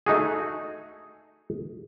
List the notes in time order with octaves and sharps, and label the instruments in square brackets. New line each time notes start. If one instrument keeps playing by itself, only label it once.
[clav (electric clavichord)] A3 D#4 F#4 G#4